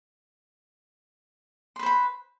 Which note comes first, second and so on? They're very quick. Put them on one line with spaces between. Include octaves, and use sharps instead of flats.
C6 B4 C5 B5